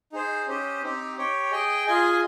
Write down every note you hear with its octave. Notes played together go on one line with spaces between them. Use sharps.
D#4 G#4 C5
C#4 G4 C5 D#5
C4 D#4 G4
G4 C#5 G5
G#4 D#5 G5
F4 G#4 D#5 G#5